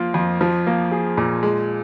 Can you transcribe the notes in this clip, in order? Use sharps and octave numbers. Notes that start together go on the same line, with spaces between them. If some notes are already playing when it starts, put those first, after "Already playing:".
Already playing: F3 A#3 F4
F2
F3
A#3
G#4
A#2
G#3